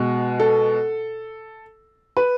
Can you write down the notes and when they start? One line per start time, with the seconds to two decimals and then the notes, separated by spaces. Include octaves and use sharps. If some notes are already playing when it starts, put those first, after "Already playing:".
Already playing: B2 G#3
0.40 A4
2.17 B4